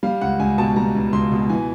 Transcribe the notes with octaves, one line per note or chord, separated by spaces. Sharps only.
G3 F5
C#2 F#5
C#2 G#5
B2 A5
G3 A#5
C#2
C#2 C6
B2
E3 G#5